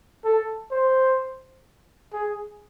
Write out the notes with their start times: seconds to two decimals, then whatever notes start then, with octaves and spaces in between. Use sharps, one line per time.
0.24 A4
0.71 C5
2.13 G#4